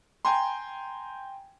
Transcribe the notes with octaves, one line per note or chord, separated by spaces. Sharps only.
G5 G#5 A#5 C6